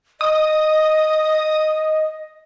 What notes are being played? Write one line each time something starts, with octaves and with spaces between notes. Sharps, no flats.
D#5 D#6